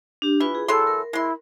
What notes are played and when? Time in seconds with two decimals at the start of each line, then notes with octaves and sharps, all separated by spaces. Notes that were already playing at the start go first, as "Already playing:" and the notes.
0.22 D4 G4
0.40 E3 E4 F4 B4
0.55 G#4
0.68 E3 F#3 A4 C6
0.87 A#4
1.13 G#3 E4 C6